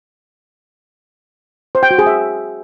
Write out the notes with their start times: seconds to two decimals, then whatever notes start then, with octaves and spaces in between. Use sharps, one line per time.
1.75 C5
1.83 G5
1.91 F#4
1.99 G#4
2.07 E5